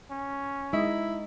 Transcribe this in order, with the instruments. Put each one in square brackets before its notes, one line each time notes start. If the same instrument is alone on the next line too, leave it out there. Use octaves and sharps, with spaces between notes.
[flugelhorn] C#4
[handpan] G#3 D#4 D#5 [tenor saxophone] E4